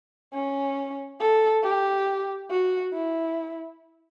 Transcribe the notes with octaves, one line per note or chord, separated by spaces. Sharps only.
C#4
A4
G4
F#4
E4